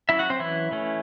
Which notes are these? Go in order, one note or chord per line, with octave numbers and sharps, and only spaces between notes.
F#3 C#4 E4 E5
F#4 F#5
C4 C5
E3 E4
E3 A3 C#4